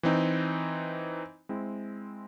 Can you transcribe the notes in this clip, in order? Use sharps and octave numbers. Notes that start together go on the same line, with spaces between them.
E3 C4 D#4
G#3 C4 E4